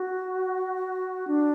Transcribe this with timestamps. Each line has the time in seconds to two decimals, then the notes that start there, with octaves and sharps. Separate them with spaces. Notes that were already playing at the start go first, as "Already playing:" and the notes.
Already playing: F#4
1.27 D4